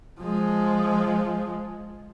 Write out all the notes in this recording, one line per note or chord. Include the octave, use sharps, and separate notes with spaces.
F3 G#3